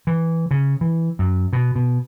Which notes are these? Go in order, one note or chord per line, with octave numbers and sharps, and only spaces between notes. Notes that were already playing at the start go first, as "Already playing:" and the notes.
E3
C#3
E3
F#2
B2
B2